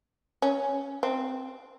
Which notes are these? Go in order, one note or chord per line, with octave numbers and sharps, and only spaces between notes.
C#4
C4